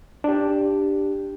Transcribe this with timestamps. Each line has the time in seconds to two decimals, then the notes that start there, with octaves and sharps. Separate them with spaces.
0.24 D4 G4